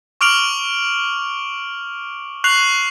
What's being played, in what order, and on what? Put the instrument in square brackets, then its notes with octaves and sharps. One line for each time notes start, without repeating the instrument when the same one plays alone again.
[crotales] C#6 D6 F6 D7 F7 F#7
C#6 F#6 C7 F7 F#7